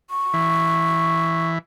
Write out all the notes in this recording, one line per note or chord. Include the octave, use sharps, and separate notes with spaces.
C#6
E3